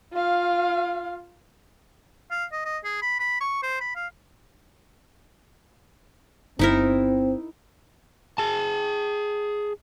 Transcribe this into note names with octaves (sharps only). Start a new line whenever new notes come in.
F4 F5
F5
D#5
D#5
G#4
B5
B5
C#6
C5
B5
F5
G1 C4 D#4 E4 A#4
G#4 A5